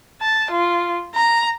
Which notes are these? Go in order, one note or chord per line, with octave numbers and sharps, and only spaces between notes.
A5
F4
A#5